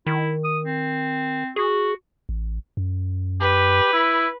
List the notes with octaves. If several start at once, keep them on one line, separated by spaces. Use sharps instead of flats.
D#3 E4
D#6
C4
F#4 G#4
A1
F#2
G4 B4
E4